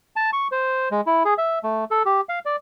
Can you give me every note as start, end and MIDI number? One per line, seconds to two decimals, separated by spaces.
0.16 0.30 81
0.33 0.48 85
0.52 0.89 72
0.91 1.01 56
1.06 1.23 64
1.25 1.34 68
1.38 1.59 76
1.63 1.84 57
1.91 2.03 69
2.05 2.21 67
2.29 2.39 77
2.45 2.56 74